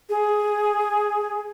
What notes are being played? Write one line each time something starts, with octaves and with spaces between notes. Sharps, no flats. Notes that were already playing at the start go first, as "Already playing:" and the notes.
G#4